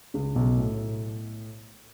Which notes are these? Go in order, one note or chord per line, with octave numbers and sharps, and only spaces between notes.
C#2 C#3
B1 B2
A2